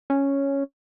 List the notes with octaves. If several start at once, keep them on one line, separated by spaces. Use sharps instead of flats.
C#4